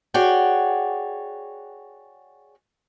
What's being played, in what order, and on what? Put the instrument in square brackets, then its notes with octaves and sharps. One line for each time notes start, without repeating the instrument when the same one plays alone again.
[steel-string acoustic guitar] F#4 G#4 C#5 D5 F#5 G5